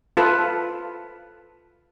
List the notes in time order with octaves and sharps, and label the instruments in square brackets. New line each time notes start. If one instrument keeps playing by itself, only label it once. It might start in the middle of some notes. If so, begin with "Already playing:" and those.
[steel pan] F4 A4 B4